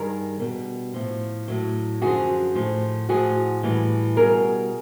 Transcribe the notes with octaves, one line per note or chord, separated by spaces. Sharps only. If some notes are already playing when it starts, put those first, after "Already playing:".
Already playing: G2 D#3 G3 G#4 A#4
B2 G3
A2 F3
A2 F#3
F#2 D3 F3 F#4 G#4
A2 F3
A2 F3 F#4 G#4
A2 E3 G3
B2 G3 G#4 A#4